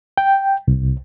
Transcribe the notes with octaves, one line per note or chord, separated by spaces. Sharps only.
G5
C2